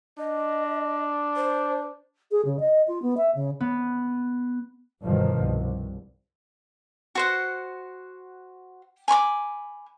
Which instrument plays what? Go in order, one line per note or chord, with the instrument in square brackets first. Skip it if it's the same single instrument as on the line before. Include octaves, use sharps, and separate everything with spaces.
[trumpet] D4 [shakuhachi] D#5
[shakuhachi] C5
[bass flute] G#4
C#3
D#5
F4
B3
E5
C#3
[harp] B3
[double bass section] G1 G2 B2 D#3 F3
C2
[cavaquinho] F#4 C5 F#5
G#5 B5 C#6 D6